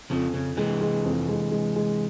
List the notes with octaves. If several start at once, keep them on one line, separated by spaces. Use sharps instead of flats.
F2 C#3 F3
F2 C#3
C3 E3 G#3
G#3
F2
G#3
G#3
G#3